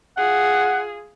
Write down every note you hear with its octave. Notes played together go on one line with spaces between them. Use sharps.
F4 G#4 F#5